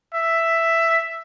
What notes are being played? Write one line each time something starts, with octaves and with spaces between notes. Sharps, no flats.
E5